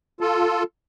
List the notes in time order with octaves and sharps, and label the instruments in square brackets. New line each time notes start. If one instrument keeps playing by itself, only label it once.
[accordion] F4 A4